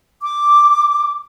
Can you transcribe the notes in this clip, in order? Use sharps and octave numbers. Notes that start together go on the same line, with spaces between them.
D6